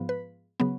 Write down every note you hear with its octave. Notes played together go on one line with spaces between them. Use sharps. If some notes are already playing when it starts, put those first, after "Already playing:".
Already playing: G#2 F3 B3
B4
C#3 F#3 B3